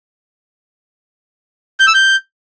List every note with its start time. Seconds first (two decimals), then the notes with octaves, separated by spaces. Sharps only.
1.80 G6
1.87 E6
1.94 G6